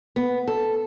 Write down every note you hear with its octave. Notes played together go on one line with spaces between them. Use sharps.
B3
A4